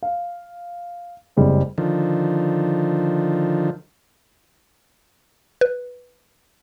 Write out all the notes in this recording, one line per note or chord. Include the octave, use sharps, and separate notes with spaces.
F5
F#1 G3 G#3 C4
D3 D#3 F3
B4